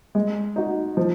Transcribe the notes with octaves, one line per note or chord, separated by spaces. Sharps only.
G#3
D#4 F#4
F3